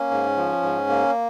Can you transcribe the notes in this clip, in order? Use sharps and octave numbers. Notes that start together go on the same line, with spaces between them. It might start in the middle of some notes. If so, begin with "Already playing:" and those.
Already playing: A#3 C#4
G#2
F3
G#2
A#3